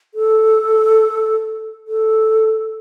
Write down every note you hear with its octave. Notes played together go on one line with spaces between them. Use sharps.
A4
A4